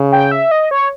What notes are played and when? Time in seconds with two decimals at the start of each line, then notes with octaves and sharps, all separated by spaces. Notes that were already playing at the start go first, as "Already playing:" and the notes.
Already playing: C#3
0.12 G5
0.32 E5
0.51 D#5
0.71 C#5